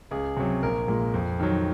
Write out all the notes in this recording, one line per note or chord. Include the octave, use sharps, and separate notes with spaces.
C#2 G#4
C3 F#3
A#1 A#4
A#2 G#3
F2
D#3 F#3